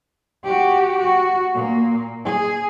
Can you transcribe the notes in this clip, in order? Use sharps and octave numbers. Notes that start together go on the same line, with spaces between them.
F#4 G4
F#4
A#2 A#3
G#4